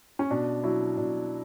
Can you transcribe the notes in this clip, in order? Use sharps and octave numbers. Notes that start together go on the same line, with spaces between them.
C#4
B2 D4
F#3 E4
B2 D4